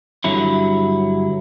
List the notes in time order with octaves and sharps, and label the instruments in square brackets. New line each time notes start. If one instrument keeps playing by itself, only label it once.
[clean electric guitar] G2 D3 F#3 E4